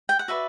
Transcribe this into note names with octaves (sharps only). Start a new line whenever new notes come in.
G5
F#5
F#4 B4 D5 E5